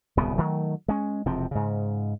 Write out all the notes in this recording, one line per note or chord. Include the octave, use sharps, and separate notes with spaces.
D1 C2 C#3 B3
D#3 F#3 A3
G#3 C#4
E1 C3 F3 C4
G#2 C#3